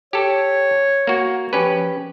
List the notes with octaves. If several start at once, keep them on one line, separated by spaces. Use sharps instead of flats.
G4 A4 C#5
A#3 F#4
F3 C#4 G4 B4